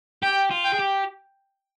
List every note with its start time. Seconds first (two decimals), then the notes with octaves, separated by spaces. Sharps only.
0.22 G4 G5
0.51 F4
0.64 G5
0.73 G#4
0.79 G4